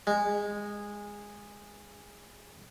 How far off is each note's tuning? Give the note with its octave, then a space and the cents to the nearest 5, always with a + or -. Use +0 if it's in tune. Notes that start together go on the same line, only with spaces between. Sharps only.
G#3 -15